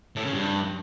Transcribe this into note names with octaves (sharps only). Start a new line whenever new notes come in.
A2
C#3
G2